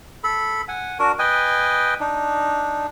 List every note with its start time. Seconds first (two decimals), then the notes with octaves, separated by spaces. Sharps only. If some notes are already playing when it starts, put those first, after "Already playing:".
0.24 A4 B5
0.68 F#5 G#5
0.99 D4 F#4 A#4
1.19 B4 D#5 G5 G#5
2.00 D4 D#4